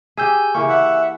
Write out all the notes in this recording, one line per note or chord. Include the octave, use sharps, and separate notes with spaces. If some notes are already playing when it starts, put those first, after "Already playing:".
G4 G#4 G#5 E6 G6
C#3 E3 A#3 C#6
D5 E5 F#5